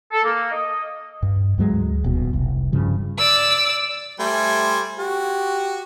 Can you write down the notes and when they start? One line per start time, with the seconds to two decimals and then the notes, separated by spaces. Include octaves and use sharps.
0.12 A4
0.24 A#3
0.52 D#5
1.23 G2
1.58 D2 G#2 F#3 G#3
2.04 D#1 B2
2.33 F1 C2
2.72 G2 C#3 F3
3.18 D5 E6
4.20 G3 A3 C5 G#5
4.99 F#4 G4